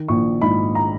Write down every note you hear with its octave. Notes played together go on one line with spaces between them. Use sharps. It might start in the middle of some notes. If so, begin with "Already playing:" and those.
Already playing: D#3
A#1 C#6
G#2 B5
A#5